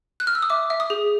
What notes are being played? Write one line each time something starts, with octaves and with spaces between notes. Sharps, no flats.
F#6
F6
E6
D#6
E5 D6
E5
D#6
G#4